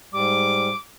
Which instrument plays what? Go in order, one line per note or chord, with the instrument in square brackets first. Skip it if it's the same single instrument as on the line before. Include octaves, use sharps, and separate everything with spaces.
[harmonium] G#2 G3 [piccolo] D6